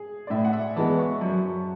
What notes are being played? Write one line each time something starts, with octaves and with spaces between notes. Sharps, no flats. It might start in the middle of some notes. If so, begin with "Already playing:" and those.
Already playing: G#4
D5
A2 E5
F#5
E5
E3 G#3 B3 A5
C#6
F#2